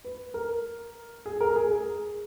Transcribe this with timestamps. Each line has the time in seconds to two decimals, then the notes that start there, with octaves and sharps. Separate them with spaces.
0.05 B4
0.34 A#4
1.26 G#4
1.41 A#4
1.56 G#4
1.71 G#4